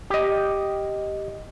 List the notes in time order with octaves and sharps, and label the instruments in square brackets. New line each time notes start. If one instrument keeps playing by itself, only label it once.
[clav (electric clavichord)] G4 D#5